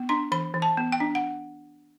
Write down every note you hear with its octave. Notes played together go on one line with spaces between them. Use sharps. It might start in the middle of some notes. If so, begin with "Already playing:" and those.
Already playing: B3
D4 C6
E3 B5
E3
A5
B3
G5
D4
F#5